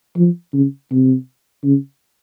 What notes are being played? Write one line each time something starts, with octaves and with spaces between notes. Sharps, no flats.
F3
C#3
C3
C#3